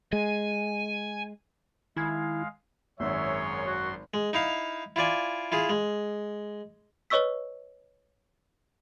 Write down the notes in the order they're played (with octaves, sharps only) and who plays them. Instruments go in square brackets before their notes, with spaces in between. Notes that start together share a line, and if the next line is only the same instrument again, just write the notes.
[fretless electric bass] G#3 [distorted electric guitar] G#5
[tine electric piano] D#3 G#5 G#6 [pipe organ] G#3 F5 [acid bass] E4
[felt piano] G#1 [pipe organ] F#2 C6 [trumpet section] G#4 A#4 C#5 [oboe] E5
[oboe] F#4
[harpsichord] G#3
D#4 E4 F5
E4 F4 D5 G#5
E4 F4 G#4
G#3
[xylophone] B4 C#5 D#5 C#6 E6 B6